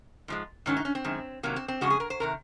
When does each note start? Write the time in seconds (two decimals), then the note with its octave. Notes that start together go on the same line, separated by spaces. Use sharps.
0.28 G#2 F3 G#3
0.66 G#2 D#3 F#3 C#4
0.77 D#4
0.85 C#4
0.95 C4
1.04 F#2 D#3 G#3
1.43 C3 D#3 F#3 A#3
1.56 C4
1.68 C4
1.81 F2 C#3 G#3 F#4
1.90 G#4
2.00 A#4
2.10 C5
2.20 C3 D#3 A#4